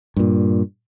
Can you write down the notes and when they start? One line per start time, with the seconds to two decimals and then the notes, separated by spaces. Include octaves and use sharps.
0.17 G2 A#2